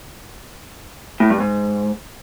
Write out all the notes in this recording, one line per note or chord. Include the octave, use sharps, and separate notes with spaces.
A2
G2
G#2